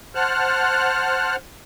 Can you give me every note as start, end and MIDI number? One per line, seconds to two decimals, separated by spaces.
0.15 1.36 72
0.15 1.36 78
0.15 1.36 81
0.15 1.36 89
0.15 1.36 90